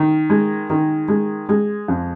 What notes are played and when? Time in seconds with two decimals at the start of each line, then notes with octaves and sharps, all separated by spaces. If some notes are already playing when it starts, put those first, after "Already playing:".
Already playing: D#3
0.30 G#3
0.70 D#3
1.08 G#3
1.49 G#3
1.88 F2